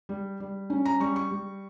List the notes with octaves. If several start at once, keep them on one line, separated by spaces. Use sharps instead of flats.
G3
G3
C#4
A#5
G3 C#6
C#6
G3